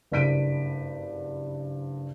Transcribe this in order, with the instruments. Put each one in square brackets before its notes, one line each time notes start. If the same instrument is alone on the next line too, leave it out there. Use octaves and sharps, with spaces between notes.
[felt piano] F#1 G2 B6 D7 D#7